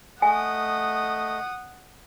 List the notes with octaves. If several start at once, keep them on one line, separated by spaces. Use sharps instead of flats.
A3 D#5 F#5 G#5 D#6